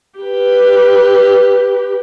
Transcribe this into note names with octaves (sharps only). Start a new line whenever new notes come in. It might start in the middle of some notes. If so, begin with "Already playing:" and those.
G4 B4